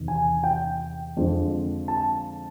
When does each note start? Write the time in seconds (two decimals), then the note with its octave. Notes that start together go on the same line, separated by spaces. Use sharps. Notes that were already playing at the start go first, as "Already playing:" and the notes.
Already playing: E2 C3 D#3
0.08 G#5
0.44 G5
1.17 F2 D3 F3 G#3
1.88 A5